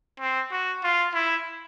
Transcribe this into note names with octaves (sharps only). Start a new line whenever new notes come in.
C4
F#4
F4
E4